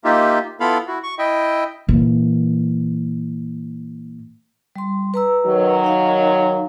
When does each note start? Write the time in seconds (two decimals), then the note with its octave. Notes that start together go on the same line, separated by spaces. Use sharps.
0.04 A#3 D#4 F4 G4 E5
0.60 B3 E4 F4 A4 F5 B5
0.87 E4 F#4
1.03 C#6
1.18 E4 D#5 E5 G5
1.89 A#2 E3
4.76 G3 C6
5.14 B4 A#5 E6
5.46 D#3 F#3
5.84 D#4 F5